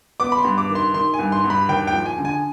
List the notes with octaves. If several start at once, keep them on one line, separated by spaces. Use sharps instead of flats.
B3 D6
B5
C6
G2
D6
D#3
C6
D#3 C6
G#5
G2
C6
G2
B5
D#2 G5
G5
F3
G#5
D3
G#5